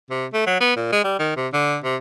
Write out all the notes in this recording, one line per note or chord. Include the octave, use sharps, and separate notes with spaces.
C3
A3
F#3
B3
A#2
G#3
G3
D#3
C3
D3
C3